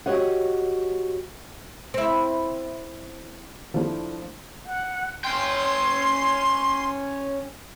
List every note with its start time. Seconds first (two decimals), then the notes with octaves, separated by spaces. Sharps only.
0.06 F#4 G4 C#5 D#5 F#5
1.94 C4 E4
3.74 F3 A3 D4 E4
4.66 F#5
5.24 C#4 G5 C6